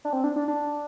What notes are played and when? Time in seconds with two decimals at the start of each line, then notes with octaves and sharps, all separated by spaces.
0.05 D4
0.13 C4
0.24 D4
0.36 D4
0.48 D4